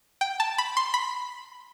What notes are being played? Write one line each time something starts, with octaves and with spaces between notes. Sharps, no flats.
G5
A5
B5
C6
B5